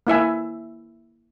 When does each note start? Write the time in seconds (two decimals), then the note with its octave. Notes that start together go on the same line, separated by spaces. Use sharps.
0.07 A#3 E4 E5 G#5